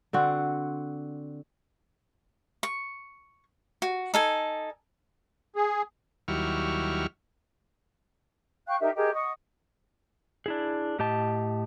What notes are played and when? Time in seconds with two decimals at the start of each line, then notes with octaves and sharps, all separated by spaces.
0.13 D3 C4 F#4
2.63 C#6
3.82 F#4
4.14 D#4 A4 G#5
5.56 G#4
6.28 D#2 F#3 G3 E4 C#6 F6
8.67 F5 G5 C#6 F#6
8.80 D#4 G4 A#4 E5
8.96 G4 G#4 A#4 D#5
9.14 D#5 F#5 C#6 D#6
10.46 D4 E4 G#4
10.99 A2 G4 D#5 A5